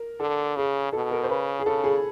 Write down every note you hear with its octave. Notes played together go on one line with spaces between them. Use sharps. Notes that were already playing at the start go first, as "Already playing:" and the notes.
Already playing: A#4
D3 A4
C#3 G#4
B2 A4
A#4
C5
C#3 B4
G#4
C#3 A4
G#4